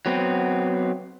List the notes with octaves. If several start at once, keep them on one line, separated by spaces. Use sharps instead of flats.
F#3 B3 C4